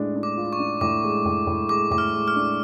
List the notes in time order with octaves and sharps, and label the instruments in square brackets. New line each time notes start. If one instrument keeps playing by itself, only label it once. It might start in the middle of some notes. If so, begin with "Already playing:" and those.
Already playing: [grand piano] A2 G#3 D4
D4
[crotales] D6
[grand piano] F4
[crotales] C#6
[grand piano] D4
[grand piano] A2 [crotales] D6
[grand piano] G#3
A2
A2
[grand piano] G#3 [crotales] D6
[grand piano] A2 [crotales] D6
[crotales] F6
[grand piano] G#3
[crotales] F6
[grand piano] D4